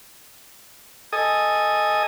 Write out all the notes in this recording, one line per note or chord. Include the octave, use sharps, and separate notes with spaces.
A4 D#5 G#5 D#6